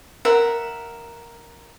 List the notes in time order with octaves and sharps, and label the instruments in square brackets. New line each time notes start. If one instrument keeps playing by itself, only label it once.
[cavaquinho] A#4 E5 F#5